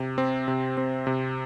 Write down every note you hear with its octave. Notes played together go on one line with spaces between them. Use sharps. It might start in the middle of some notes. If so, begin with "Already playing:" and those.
Already playing: C3
C4
C3
C4
C3